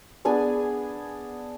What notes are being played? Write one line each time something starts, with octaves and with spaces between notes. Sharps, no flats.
B3 D4 G#4 G#5